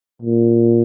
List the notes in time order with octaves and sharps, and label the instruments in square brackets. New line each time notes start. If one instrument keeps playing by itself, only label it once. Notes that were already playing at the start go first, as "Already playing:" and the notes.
[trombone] A#2